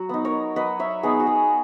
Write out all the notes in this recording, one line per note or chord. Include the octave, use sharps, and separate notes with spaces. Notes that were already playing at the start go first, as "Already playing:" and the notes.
Already playing: F#3 F#4
B3 D#4
A#4 C#5
F#3 B4 D#5
C#5 E5
B3 D#4 G#4
F#4
G#4